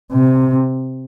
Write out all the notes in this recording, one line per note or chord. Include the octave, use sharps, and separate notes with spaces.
C3